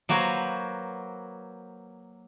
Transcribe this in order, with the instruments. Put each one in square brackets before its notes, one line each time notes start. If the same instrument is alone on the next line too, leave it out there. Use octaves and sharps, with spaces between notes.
[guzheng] F#3 A#3 F#4 B4 C5